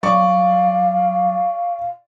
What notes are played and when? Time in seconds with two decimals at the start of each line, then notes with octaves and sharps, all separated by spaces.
0.03 F#3 D5 F5 C#6